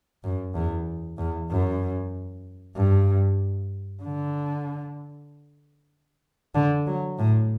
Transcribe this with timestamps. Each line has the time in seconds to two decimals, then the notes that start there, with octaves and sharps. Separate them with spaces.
0.24 F#2
0.55 E2
1.18 E2
1.50 F#2
2.76 G2
4.03 D3
6.55 D3
6.87 F#3
7.19 A2